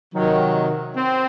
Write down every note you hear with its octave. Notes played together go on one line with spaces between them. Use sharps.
C3 D#3 F#3
C4